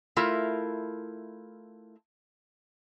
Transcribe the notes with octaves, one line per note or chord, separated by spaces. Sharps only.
A3 E4 F4 A#4